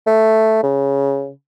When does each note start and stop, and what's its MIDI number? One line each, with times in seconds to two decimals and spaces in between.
0.07 0.62 57
0.63 1.31 49